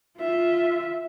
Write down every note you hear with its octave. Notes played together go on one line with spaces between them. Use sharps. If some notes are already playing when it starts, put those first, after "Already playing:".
F4 E5